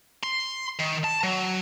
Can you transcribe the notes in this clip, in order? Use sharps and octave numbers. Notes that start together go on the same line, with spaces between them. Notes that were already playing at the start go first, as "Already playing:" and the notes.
C6
D#3
A5
F#3